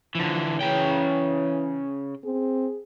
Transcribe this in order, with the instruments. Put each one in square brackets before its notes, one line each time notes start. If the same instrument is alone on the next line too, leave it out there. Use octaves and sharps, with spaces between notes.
[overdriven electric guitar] D3 E3 [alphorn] F3
[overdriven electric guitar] C#3 G5 [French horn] E3 [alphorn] C#5
[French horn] C4 [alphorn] G#4